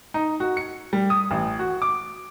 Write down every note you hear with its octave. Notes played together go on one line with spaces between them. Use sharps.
D#4
F#4
C#7
G3
D#6
A1
F#4
D6